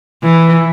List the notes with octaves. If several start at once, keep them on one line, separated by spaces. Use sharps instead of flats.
E3